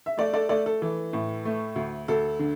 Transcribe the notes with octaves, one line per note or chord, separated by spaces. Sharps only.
E5
A3 A4 D5
A4 D5
A3 A4 D5
A4
E3
A2
A3
D2
D2 A4
D3